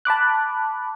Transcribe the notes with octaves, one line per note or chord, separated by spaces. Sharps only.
A5 B5 D6 F#6